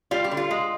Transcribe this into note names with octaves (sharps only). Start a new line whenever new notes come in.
G3 F4
G4
D3
F4
G#3